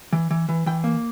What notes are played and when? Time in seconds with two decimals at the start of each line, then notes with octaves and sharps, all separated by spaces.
0.13 E3
0.31 E3
0.49 E3
0.66 E3 G5
0.84 A#3